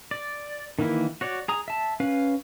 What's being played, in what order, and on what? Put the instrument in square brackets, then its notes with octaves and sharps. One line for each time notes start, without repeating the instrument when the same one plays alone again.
[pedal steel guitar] D5
D#3 E3 A#3 E4
F#4 C#5 D5
G#4 A#5 D#6
E5 A5
C#4 B4 F5